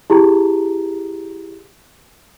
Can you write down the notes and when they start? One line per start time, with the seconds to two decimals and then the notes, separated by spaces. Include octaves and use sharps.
0.10 E4 G4 G#4 A#5